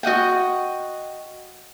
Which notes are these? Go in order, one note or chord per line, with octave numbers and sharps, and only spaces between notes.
F#4 D#5 F#5 G5